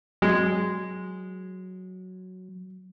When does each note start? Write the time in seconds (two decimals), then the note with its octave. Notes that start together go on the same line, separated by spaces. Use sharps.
0.22 F#3 G#3